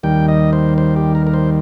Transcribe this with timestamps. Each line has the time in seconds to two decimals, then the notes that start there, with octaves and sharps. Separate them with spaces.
0.03 D#2 D#3 G3 G5
0.28 D#5
0.53 C5
0.78 C5
0.96 G4
1.15 A#4
1.27 A#4
1.34 C5